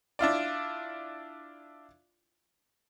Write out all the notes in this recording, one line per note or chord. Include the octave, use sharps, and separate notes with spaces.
D4 E4 F4 D5